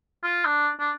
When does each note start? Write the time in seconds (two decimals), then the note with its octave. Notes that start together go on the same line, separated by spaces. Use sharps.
0.24 F4
0.45 D4
0.80 D4